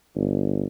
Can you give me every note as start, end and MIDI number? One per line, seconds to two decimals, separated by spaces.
0.16 0.66 31